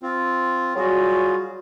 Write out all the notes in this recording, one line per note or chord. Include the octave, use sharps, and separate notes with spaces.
C4 F4
F#3 G3 F4 F#4 G#4